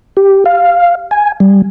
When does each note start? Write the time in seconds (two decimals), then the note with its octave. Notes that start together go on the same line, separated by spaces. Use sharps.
0.17 G4
0.46 F5
1.11 G#5
1.40 G3